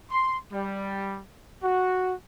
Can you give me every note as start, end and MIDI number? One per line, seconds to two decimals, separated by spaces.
0.11 0.36 84
0.52 1.20 55
1.63 2.12 66